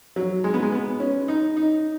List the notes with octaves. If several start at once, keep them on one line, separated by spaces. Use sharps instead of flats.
F#3
G#3
B3
G#3
B3
C#4
D#4
D#4